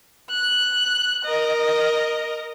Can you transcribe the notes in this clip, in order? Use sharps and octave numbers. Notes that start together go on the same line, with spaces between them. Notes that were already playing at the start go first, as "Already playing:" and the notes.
F#6
A#4 D#5